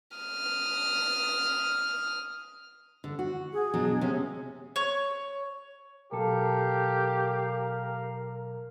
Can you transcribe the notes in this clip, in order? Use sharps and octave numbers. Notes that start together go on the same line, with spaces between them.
D#6 F6
D3
F#4
G#4
B2 F#3 D4
C3 C#4
C#5
B1 G4 A4 A#4 F5